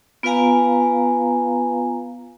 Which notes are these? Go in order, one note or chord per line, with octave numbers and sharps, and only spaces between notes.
B3 F4 B4 F5 G#5 A#5